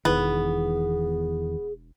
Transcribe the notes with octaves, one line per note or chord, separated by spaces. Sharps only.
E1 E2 D#3 E3 B3 G#4